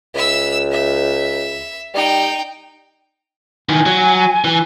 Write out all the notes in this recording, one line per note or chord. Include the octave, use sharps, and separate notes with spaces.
C#2 E5 E6
E5
G3 D#4 G5
D#3 E3 G#5
F#3
E3